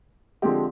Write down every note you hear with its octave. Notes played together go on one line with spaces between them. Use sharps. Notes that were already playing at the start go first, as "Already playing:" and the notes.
D3 F3 G#3 C4 G4